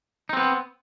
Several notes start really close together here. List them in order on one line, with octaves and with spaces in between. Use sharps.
D#4 C4 B3